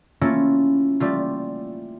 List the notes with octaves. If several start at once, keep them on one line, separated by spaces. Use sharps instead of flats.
A3 A#3 C#4 E4 F4
G3 A3 F4